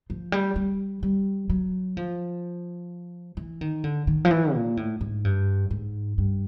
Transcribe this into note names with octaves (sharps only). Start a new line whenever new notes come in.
F3
G3
G3
G3
F#3
F3
E3
D#3
D3
D#3
F3
E3
A#2
A2
G#2
G2
G#2
G2